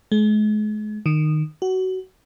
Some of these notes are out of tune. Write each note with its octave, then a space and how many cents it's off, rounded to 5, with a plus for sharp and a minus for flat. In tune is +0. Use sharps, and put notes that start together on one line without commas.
G#3 +40
D#3 -20
F#4 +20